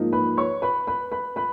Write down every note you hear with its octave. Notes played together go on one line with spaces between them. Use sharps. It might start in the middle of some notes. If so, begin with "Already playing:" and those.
Already playing: G#2 F3 A#3 D#4
B4 B5
C#5 C#6
B4 B5
B4 B5
B4 B5
B4 B5